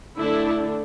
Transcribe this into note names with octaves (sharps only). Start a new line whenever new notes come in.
D3 A3 D4 E4